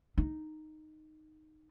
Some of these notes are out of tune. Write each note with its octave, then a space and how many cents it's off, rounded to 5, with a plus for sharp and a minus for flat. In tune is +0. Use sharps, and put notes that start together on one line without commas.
D#4 -5